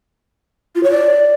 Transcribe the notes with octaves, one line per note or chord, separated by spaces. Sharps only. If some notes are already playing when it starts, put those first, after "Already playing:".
F4
C#5
D5